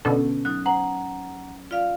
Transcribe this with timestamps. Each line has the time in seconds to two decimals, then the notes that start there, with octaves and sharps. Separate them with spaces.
0.05 B2 D3 C#4 A4
0.45 F#3 D#4 F#6
0.66 C5 F#5 A#5 F#7
1.71 F4 D5 F5